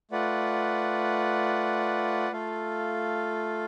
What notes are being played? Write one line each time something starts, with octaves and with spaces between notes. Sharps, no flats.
A3 F4 B4 D5 F#5
A3 F4 A4 F5